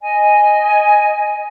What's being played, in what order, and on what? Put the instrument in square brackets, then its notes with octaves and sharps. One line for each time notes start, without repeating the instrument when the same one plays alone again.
[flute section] D#5 G#5